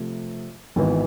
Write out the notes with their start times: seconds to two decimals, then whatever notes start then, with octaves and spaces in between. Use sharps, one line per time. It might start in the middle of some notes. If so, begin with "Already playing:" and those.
Already playing: C3 F3 A3
0.76 G#1 G#2 E3 B3